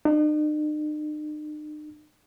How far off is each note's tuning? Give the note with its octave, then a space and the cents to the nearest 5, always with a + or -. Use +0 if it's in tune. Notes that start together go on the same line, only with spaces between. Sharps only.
D#4 -45